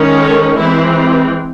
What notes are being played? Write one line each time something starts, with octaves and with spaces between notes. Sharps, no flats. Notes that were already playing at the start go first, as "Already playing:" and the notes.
Already playing: D#3 G#3 C#4
A4 C#5
E3 G#3 C4 E4